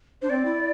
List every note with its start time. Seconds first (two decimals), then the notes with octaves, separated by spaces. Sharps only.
0.22 D4 C5
0.30 C4 D5
0.45 E4